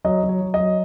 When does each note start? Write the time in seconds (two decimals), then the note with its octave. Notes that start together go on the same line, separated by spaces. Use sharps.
0.05 F#3 D#5
0.23 F#3
0.29 C#5
0.41 F#3
0.54 D#5
0.60 F#3